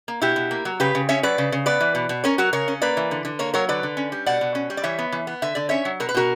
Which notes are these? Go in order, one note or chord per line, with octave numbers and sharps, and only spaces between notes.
A#3
B2 E4 G4
B2
A#3
F#3
C#3 G4 B4
C#3
C#4 C#5 E5
F#3 B4 D5
C#3
C#3
B3 B4 D5
E3
B2
B2
C#4 A#4 C#5
F#3 F#4 A#4
C#3 A#4 C#5
C#4
A#3 B4 D5
E3
D3
D3
A#3 A#4 C#5
F#3 A#4 C#5
D3 B4 D5
D3
C#4
G3
B2 D5 F#5
B2
C#4
G3
D5
E3 C#5 E5
B3
E3
B3
D3 E5
D3 D5
C#4 C#5 E5
F#3
B2 A#4
B4
B2 F#4 A#4